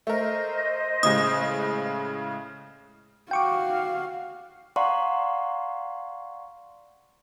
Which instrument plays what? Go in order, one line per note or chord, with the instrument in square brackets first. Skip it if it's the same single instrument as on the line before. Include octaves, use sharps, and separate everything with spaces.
[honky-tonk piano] A3 A#4 [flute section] C5 D#5
[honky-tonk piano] A2 C#3 G#3 [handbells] D#6
[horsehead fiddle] F#4 F5 [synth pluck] G5 C#6 D6
[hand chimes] D5 F5 F#5 A#5 C6 C#6